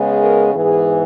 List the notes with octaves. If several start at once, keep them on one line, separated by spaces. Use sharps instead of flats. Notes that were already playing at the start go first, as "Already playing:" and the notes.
Already playing: C#3 G#3 B3
A#4
G#2 E3 B3 G#4